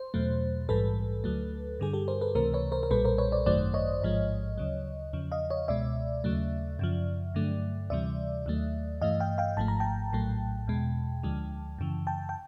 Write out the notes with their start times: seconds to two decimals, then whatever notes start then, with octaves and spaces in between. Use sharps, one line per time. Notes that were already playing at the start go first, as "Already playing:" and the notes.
Already playing: C5
0.14 E2 B2 F#3 A3
0.69 A#1 G#2 E3 G3 A4 B4
1.24 D2 D3 F#3 A3
1.80 G2 D3 G3 G#4
1.93 G4 A4
2.08 A#4 C5
2.21 A4 B4
2.35 C#2 C3 E3 A3 A#4 C5
2.54 B4 C#5
2.72 A#4 C5
2.83 A#4
2.91 B1 A#2 G3 A4 B4
3.05 A#4 C5
3.18 B4 C#5
3.32 C5 D5
3.46 G#1 F#2 D#3 F#3 A3 C5 D5
3.74 C#5 D#5
4.02 A1 G#2 F3 G#3
4.58 D2 C#3 F#3
5.13 E2 C#3 F3
5.32 D#5 F5
5.50 C#5 D#5
5.68 C#2 B2 G#3 D5 E5
6.24 D#2 C#3 F#3 A3
6.79 F#2 C#3 F3
7.35 G2 D3 F#3 A3
7.90 D2 C3 E3 G3 D5 E5
8.46 D#2 D#3 F#3 A3
9.02 G2 E3 A3 D#5 F5
9.20 F5 G5
9.38 F5 G5
9.57 G#1 G#2 F3 A3 A5
9.68 A#5
9.80 G5 A5
10.13 A#1 A2 F#3 A3
10.68 E2 B2 G#3
11.23 D2 D3 F3 G#3
11.79 F#2 C#3 E3
12.07 G5 A5
12.29 G5